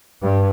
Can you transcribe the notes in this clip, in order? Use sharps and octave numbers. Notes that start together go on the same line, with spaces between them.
G2